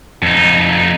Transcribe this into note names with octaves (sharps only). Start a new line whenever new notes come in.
F2 D#4